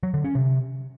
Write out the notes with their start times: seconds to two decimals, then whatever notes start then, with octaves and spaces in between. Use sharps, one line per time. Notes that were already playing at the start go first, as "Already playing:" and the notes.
0.03 F#3
0.14 D3
0.24 C#4
0.35 C3